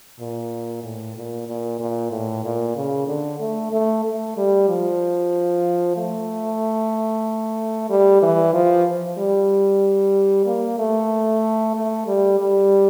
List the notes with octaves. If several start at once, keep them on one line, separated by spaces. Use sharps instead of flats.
A#2
A2
A#2
A#2
A#2
A2
A#2
C#3
D3
A3
A3
A3
G3
F3
A3
G3
E3
F3
G3
A#3
A3
A3
G3
G3